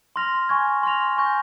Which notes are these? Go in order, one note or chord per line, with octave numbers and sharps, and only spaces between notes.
C6 F6 A#6 F7
G#5 C#6 G#6
C6 F6 A#6 F7
G#5 C#6 G6 A#6